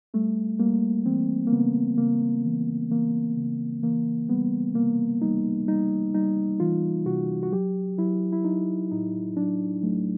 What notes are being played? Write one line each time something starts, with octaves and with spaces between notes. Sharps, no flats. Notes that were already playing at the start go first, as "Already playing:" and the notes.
G3 A3
G3 A#3
E3 C4
A#3
C#3 B3
C#3 A#3
E3
E3 A#3
C#3
E3 A#3
G3 B3
C3 A#3
G3 D#4
G3 D#4
G3 D#4
E3 F4
C3 F#4
F#4
F#3 G4
F#3 E4
E4
F#3 D#4
A2 D#4
F#3 D4
F#3 A3